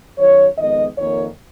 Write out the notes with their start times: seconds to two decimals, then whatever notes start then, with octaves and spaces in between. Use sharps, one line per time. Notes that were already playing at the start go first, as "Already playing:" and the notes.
0.18 F#2 D#3 F#3 C#5
0.56 F2 D#3 G#3 B3 D#5
0.95 F2 D#3 A#3 C#5